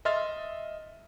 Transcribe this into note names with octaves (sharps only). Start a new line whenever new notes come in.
D#5 E5 C6 F6 A6